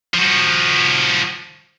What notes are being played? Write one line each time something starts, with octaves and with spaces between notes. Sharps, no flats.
F3 F#4